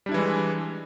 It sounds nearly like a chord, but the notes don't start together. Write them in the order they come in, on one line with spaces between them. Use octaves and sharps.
G3 D4 E4 E3 G#3